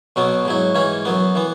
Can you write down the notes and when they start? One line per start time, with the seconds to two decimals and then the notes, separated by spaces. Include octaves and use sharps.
0.16 B1 B2 F#3 B3
0.45 G#2 F#3 E4
0.75 G#2 E3 C#4 E4
1.05 F#2 F#3 B3
1.35 E3 B3